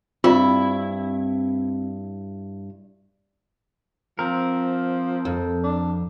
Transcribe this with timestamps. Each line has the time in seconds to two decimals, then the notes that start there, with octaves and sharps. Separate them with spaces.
0.24 G2 C4 E4 F4
4.19 F3 C4 A#4
5.25 F2
5.64 D4